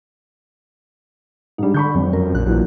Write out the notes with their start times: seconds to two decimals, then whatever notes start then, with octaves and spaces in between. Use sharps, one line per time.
1.58 G#2 G3 D4 D#4
1.74 D3 B5 C#6 G6
1.95 G#1 F2 F#3
2.13 F#2 A#4
2.35 A#1 F#6
2.46 A#1 A#2 E3 F#3